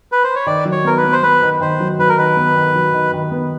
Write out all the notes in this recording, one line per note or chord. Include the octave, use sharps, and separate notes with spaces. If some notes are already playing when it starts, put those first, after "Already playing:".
B4
C5
C#5
D#3 D5
F#3
C#5
B3 A#4
B4
B3
C5
B3 B4
D#3
D#3 C5
F#3
F#3 B4
A#4
D#3 B4
B3
D#3
F#3
D#3
D#3
B3